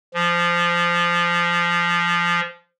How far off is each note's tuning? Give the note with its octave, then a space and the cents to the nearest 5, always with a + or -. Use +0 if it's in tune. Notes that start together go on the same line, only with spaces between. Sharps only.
F3 -15